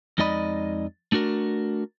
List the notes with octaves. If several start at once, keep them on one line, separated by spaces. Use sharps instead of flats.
F2 G#3 D#4 D5 D#5 B5
A3 D4 F#4 A#4